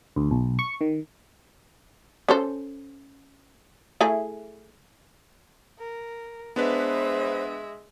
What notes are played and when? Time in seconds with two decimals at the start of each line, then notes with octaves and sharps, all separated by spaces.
0.16 D2
0.31 B1
0.59 C#6
0.81 D#3
2.29 C#4 A4 C5
4.01 A3 E4 G#4
5.79 A#4
6.56 G#3 B3 D4 B4 C5 E5